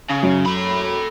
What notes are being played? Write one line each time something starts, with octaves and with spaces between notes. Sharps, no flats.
C#3
F#2
A4 B5